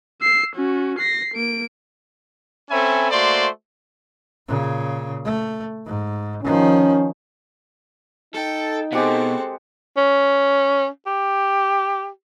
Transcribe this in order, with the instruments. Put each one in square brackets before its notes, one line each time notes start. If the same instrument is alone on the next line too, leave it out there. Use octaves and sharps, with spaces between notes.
[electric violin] E6 C7
C#4 F#4
A#6 C7
A#3 D7
[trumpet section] C4 C#4 A4 E5 G#5 B5
A3 A#3 F#4 C5 D5 C6
[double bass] A#2 C#3
A3
G#2
[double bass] D#3 F3 [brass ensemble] C#4
[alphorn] D#4 [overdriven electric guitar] A4 [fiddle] G5
[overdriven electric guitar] B2 [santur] G#3 G4 F#5 [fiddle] C4 A4
[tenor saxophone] C#4
G4